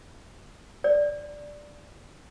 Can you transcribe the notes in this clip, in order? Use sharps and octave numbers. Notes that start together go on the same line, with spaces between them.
D5